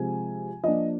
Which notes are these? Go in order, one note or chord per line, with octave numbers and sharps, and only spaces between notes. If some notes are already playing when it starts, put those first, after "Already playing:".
Already playing: C3 F3 G#3 G#5
F3 A#3 D4 D#5